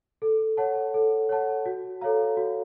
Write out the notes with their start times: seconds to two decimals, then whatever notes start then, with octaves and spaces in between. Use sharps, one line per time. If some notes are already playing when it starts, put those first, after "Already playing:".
0.22 A4
0.57 C#5 F#5 A5
0.94 A4
1.29 C#5 F#5 A5
1.66 F#4
2.01 A4 C#5 F5 A#5
2.37 F#4